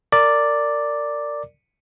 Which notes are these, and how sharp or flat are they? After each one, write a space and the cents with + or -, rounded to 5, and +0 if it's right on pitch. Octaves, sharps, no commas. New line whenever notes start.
A#4 -25 D5 +0